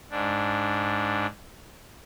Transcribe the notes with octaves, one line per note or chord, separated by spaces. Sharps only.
G#2 D4